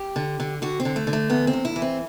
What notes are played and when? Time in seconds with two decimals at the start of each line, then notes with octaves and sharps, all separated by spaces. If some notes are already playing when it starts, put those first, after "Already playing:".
Already playing: G4
0.16 D3
0.40 D3
0.62 D3 F#4
0.80 C4
0.85 D3
0.96 A3
1.07 D3
1.13 A3
1.30 E2 B3
1.47 C4
1.53 E2
1.65 E4
1.76 E3
1.82 C4